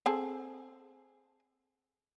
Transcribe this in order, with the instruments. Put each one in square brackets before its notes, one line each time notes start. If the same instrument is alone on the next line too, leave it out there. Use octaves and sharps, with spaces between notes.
[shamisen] C4 G#4 A4